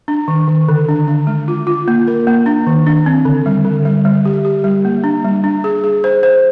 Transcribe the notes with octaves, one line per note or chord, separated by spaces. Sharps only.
D4
D#3
D#3
D3
D4
D4
G#3
F4
F4
A#3
A#4
A#3
D4
D#3
D4
C4
D3
G3
D3
G3
G3
G4
G4
G3
A#3
D4
G3
D4
G#4
G#4
C5
C5